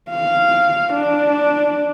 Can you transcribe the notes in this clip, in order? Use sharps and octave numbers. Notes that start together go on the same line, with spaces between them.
F5
D4